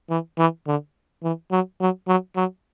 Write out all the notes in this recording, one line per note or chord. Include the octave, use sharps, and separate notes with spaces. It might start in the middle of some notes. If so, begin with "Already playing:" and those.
E3
E3
D3
E3
F#3
F#3
F#3
F#3